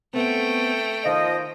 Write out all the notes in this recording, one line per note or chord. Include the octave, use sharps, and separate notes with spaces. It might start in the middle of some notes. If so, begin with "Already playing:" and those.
A3 B3 C4 G5
D#3 F3 D#5